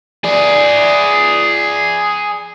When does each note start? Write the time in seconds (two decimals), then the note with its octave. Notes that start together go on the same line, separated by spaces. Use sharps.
0.24 G#4 D5